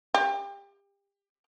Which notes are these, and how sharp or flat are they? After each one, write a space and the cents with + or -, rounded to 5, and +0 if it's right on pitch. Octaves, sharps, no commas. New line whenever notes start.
G4 +30